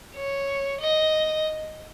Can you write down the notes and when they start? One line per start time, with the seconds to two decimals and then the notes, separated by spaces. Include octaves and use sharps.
0.15 C#5
0.81 D#5